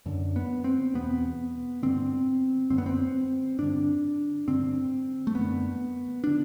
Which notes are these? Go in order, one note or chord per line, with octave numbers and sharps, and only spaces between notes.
F#2 D3
B3
C4
E2 B2 B3
G2 D3 C4
F#2 D3 C4
B3
C4
G2 D3 D4
G2 D3 C4
A3
F#2 D3 B3
D3 D4